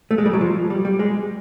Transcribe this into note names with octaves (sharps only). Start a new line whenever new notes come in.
A3
G#3
G3
F#3
F3
G3
G3
G#3